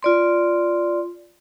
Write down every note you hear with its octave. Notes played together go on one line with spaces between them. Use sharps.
F4 D5 C6